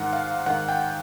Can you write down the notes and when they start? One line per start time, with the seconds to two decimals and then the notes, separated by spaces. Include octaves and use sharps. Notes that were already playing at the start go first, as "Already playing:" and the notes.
Already playing: G#2 D#3 F#5
0.13 F5
0.46 G#2 D#3 F#5
0.68 G5